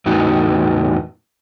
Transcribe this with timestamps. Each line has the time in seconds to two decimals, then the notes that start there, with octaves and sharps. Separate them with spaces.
0.06 E2 A2 D#4 F#4